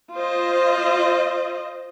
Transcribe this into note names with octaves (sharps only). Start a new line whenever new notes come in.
F4 C5 D#5